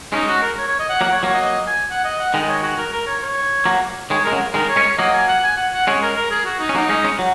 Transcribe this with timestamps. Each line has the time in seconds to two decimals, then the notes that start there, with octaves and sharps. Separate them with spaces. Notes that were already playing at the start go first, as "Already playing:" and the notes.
0.13 G#3 C#4 D#4
0.28 F#4
0.42 A#4
0.58 C#5
0.68 C#5
0.80 D#5
0.90 F#5
1.01 F#3 A#3 F#5
1.12 C#5
1.23 F#3 A#3 C#5
1.34 D#5
1.45 D#5
1.67 G#5
1.90 F#5
2.04 D#5
2.20 F#5
2.34 D#3 G#3 D#5
2.49 C#5
2.63 F#4
2.78 A#4
2.93 A#4
3.07 C#5
3.22 C#5
3.66 F#3 A#3
4.10 D#3 G#3 C#5
4.24 G#3 A#4
4.32 C#3 F#3
4.54 D#3 G#3 A#4
4.69 C#5
4.76 G#3 C#4
4.84 C#5
4.98 F#3 A#3 D#5
5.13 G#5
5.28 F#5
5.43 G#5
5.57 F#5
5.73 F#5
5.87 G#3 C#4 C#5
6.02 A#4
6.16 A#4
6.31 G#4
6.45 F#4
6.60 D#4
6.69 C#4
6.75 F#3 A#3 D#4
6.89 G#3 C#4
7.04 G#3 C#4
7.19 F#3